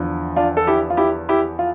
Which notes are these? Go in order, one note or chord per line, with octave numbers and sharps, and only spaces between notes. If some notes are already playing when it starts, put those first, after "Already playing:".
Already playing: E2 D3 F3
D4 F4
A4
E4 G4
F4
E4 G4
E4 G4
F4